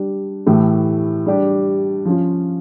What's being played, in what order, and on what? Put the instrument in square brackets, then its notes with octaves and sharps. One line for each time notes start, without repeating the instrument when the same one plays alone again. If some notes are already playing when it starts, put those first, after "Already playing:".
Already playing: [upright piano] G3 D4 G4
A2 E3 A3 E4 G4
G3 D4 G4
F3 C#4 F4